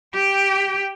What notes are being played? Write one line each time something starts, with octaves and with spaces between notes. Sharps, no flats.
G4 G5